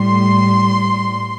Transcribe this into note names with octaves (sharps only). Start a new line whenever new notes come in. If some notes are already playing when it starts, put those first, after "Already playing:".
Already playing: A2 G3 C6